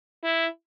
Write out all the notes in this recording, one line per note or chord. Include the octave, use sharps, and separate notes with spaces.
E4